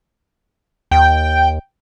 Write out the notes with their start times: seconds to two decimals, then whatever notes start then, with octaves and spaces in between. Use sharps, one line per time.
0.91 D#2 G5